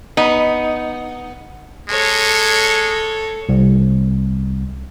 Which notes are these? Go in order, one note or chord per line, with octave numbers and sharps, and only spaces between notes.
B3 D#4
G#3 A4 C#5
C2